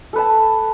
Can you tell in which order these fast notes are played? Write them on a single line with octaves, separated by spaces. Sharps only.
A4 B4 A5